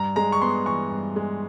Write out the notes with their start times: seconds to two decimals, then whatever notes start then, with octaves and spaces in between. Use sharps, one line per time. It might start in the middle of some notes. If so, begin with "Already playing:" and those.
Already playing: G2 A#5
0.16 G#3 A#5
0.32 C#6
0.42 B3 C6
0.66 E3 C#6
0.91 G2
1.16 G#3